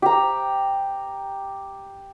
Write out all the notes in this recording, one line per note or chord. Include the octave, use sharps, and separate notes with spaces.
G4 A#5